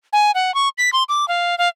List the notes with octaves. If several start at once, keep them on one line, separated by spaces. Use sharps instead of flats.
G#5
F#5
C#6
B6
C6
D6
F5
F5